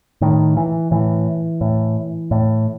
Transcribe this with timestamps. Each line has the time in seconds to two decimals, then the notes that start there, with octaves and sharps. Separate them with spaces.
0.21 A2 D#3
0.57 E3
0.91 A2 E3
1.61 A2
2.31 A2